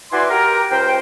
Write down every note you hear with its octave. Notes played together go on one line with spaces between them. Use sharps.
E4 F#4 B4 D5 G#5 C6
G4 A#4
C#2 C5 G5